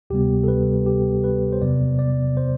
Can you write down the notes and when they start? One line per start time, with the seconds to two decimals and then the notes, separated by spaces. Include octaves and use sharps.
0.10 D2 C3 G3 B3 G4
0.43 A4
0.48 B4
0.86 G4
1.24 B4
1.53 C5
1.61 E2 C3 F#3 B3 D5
1.99 D5
2.37 C5